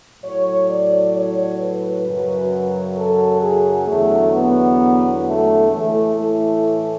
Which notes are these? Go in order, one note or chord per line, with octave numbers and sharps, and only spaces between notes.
A2 F#3 C#5
D5
C#5
B4
F#2 C#3 F#3
A4
G#4
E2 D3 F#3 A3
B3
A3
A2 E3 A3
A3